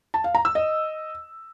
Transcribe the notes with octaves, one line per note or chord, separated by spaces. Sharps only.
A5
F5
A#5
E6
D#5